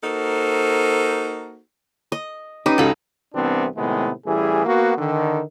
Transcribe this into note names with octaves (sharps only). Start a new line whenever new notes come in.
A#3 D#4 F#4 A4 C5
D#5
C#4 D#4 G4 B4 D6 D#7
C#2 F#4 A4 F5 B5
C2 E3 B3 C4 D4
A2 C3 D#3 G#3 B3
A1 E3 G3 G#4
A#3 B3 F#4
D3 D#3